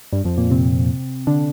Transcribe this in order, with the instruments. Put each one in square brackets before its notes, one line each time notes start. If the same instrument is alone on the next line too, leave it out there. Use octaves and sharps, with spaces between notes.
[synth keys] G2 G3
F2 F3
A#2 A#3
C3 C4
D3 D4